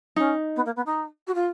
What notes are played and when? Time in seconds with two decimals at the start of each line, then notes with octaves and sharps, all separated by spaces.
0.16 C#4 D#4
0.56 B3
0.66 A#3
0.76 B3
0.86 D#4
1.27 F#4
1.34 F4